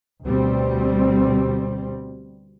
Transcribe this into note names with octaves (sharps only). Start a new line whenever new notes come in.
D2 B2 G3 C4